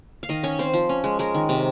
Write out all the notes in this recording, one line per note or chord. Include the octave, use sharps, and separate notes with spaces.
F5
D#3 D#5
C#4 C#5
C4 C5
F3
C#4
G#3
G#3 A#4
D#3
C3